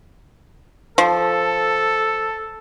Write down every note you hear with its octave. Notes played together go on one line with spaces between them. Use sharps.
F3 A4